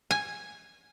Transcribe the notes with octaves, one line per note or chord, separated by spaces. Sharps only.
G#5